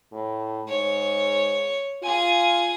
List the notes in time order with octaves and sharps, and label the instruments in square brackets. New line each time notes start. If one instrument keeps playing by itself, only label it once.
[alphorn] A2
[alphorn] G#2 [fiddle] C#5
[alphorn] F4 [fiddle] G#4 G#5